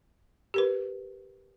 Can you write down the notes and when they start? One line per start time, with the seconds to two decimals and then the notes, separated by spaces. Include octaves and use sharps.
0.54 G4 A#4 B4